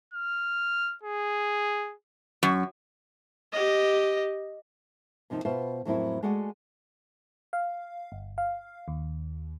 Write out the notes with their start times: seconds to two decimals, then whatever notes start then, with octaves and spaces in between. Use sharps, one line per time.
0.14 F6
1.03 G#4
2.43 F#2
3.52 G4 D#5
5.30 D#2 C3 F3 D#4
5.45 B2 F4 B4 C5 E5
5.85 F2 A2 F#3 A#3 C4 E4
6.23 G#3 A3 F#4 D5 F#5 G#5
7.53 F5
8.12 G1
8.38 F5
8.88 D#2